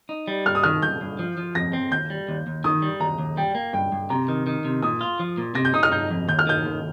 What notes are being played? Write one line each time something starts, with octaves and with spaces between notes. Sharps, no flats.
D#4
G3
G2 F6
D#6
D#3 F6
G2 G6
G2
F3
F3
F2 A#6
C4
D#2 G6
G3
D#2
D#2
D#3 D#6
G3
D#2 A#5
D#2
G3 G5
A#3
G2 G5
G2
C3 A#5
D#3
D#3
C3
A#2 D#6
F4
F3
A#2
C3 A#6
G6
D#4 D#6
F6
D#4 G6
F2
D#2 G6
F6
D#3 G6
D#2